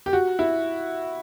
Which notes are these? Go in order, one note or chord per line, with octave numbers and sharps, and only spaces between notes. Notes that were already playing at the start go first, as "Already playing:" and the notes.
G4
F#4
E4